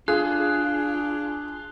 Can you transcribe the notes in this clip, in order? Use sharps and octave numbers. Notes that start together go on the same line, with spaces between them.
D4 F4 G#4 F#6